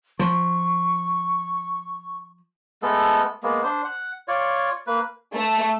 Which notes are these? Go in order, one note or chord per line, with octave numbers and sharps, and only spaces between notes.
F3 C#6
G#3 A3 B3 A4
G#3 A#3 B3
D4 C5
F#5
F4 C#5 D5
A#3 B4
A3